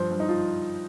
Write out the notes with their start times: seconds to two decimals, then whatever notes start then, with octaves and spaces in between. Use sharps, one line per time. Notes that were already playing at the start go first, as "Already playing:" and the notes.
Already playing: G2 F3 C5
0.11 G2
0.20 D#4
0.29 F3 F4